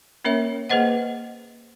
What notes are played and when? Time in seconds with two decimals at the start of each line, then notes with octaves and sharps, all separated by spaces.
0.25 A#3 C#4 A#4 C#5 E5
0.69 A#3 G#4 B4 C5 D#5 F#5